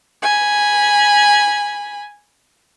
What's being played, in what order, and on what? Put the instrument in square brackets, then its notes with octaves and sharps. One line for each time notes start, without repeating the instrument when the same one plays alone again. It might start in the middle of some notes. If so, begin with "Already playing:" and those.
[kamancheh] G#5 B5